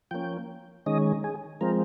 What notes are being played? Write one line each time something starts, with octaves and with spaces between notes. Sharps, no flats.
F3 A#3 C#4 G5
D#3 G#3 C#4 D#5
G#4
F3 G#3 C4 A#4